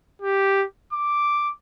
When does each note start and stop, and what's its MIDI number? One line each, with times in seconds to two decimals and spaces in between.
0.22 0.65 67
0.93 1.51 86